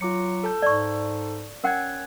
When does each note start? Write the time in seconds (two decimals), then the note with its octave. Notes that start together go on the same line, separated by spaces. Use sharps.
0.01 F#3 F4 D6 C#7
0.44 A4 A5 G6
0.62 G#2 D5 C#6
1.64 C#4 A#4 F#5 G5 F#6 G#6